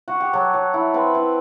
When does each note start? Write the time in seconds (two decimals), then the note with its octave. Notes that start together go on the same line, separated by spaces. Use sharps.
0.08 F#4
0.20 G4
0.33 F#3 A4
0.54 F#3
0.74 E4
0.94 C4 B4
1.14 E4